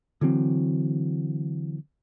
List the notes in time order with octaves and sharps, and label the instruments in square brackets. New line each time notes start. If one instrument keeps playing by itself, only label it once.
[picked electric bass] D3 E3 F#3 C4